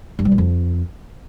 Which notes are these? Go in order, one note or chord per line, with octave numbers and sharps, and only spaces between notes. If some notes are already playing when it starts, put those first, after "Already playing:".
G2
G3
A#2
F2